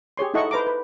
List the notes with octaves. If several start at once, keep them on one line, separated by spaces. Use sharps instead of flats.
G4 G#4 C#5 C6
D#4 E4 A4 D#5 F#5 C#6
B4 C5 A#5 D6
B4